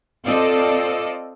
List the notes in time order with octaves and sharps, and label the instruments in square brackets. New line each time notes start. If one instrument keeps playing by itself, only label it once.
[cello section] C4 F4 A4 D5 D#5